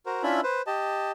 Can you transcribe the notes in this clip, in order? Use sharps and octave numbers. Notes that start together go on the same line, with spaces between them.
F#4 A#4 C5
C#4 D4 E4 F4 E5 B5
B4 C5
G4 D#5 A5